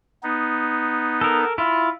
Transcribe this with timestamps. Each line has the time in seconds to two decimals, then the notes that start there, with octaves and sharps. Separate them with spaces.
0.23 B3 D#4
1.21 A4 A#4
1.58 E4 F4